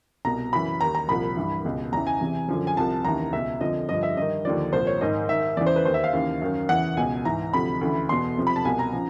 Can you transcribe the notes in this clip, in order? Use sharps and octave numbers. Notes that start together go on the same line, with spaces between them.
C2 B2 A#5
F#2 C#3 E3 B5
D#2 D#3 A#5
A#5
C2 A#2 F3 B5
G2 E3
C#2 B2
E2 C#3 E3 A#5
G#5
E2 C3 E3
F#2 D3 F3
G#5
C2 C3 F3 A5
D#2 C#3 E3 A#5
C#2 B2 E5
F2 D3 F3 D#5
G2 D3 F3 D#5
E5
G2 D#3 D#5
D#2 D3 F3 D5
C2 A#2 F3 C5
C#5
G#2 D#3 D#5
G#2 D#3 E5
E2 C#3 E3 D5
C5
B4
D#2 D#3 C5
E5
F5
D#2 C#3 E3
F#2 D#3
E2 C#3 E3 F#5
C#2 B2 G#5
G#2 E3 A#5
D2 C3 F3 B5
D2 C#3 E3
E2 B2 C6
F2 C3 F3
B5
A5
C2 B2 G#5
A#5
C#3 F3